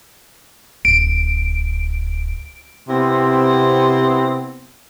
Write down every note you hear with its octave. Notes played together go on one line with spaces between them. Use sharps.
D1 D7
C3 B3 C4 E4